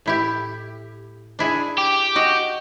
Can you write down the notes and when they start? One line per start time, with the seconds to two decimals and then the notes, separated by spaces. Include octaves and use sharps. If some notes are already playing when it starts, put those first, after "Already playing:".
0.06 A2 E4 G4
1.39 D4 E4 G#4
1.78 G4
2.16 F#4 D#5 F#5